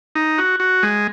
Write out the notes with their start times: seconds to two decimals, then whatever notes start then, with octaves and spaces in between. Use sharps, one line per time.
0.15 D#4
0.38 F#4
0.60 F#4
0.83 G#3